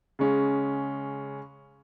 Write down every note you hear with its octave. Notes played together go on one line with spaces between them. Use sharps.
C#3 G#3 C#4